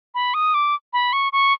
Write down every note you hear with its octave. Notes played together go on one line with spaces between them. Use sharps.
B5
D#6
D6
B5
C#6
C#6